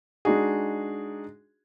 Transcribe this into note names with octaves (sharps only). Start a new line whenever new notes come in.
G#3 D4 D#4 F#4 G#4